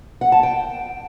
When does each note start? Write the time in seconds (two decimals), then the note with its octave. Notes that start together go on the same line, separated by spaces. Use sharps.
0.21 F#5
0.32 A5
0.43 G5